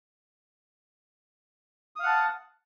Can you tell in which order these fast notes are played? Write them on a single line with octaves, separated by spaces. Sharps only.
D#6 F5 F#5 A5